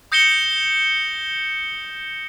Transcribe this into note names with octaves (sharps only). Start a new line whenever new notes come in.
D#6 G6 A#6 C#7 E7 G7